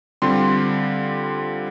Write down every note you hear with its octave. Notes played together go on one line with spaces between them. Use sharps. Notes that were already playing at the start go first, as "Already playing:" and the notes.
D3 G3 C4 F4 C6